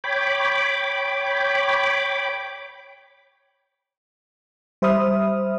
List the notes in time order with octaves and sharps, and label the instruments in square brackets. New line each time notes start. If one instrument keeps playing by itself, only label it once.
[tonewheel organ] C#5 G5 B5 D6
[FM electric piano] G3 C5 E5 B5 D#6 F6